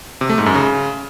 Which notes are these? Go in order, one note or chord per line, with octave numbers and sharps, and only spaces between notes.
C3
A3
G#2
F#2
C#3